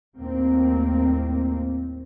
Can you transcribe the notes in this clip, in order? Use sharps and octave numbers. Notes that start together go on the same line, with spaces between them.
D#2 A2 A#3 C4